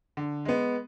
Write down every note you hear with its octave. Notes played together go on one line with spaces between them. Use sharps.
D3
G#3 B3